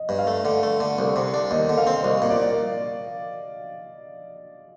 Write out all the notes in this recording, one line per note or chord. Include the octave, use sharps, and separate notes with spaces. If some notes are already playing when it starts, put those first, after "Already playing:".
Already playing: D#5
G2
F5
A3
D3
A3
D3
C2
C3
D4
D#2 D#5
D3
F5
C4
C2 D#5
A#2
D5